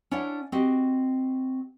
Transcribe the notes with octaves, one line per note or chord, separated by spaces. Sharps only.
C#4 D4 E4 C#5 F#5
C4 F#4 G4 D#5